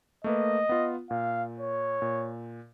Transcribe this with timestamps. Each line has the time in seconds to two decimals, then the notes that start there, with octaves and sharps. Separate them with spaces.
0.24 A3 A#3 B4 D#5
0.69 B3 F4
1.11 A#2 F5
1.60 C#5
2.02 A#2